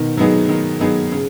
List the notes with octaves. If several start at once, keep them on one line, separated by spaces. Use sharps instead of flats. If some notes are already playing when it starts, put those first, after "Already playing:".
Already playing: B2 D#3
F#3 B3 D#4 G#4
D#3
F#3 B3 D#4 G#4
C#3